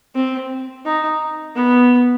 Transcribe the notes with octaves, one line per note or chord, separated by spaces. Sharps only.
C4
D#4
B3